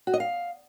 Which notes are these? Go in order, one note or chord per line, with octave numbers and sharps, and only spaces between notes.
F#4
D#5
F5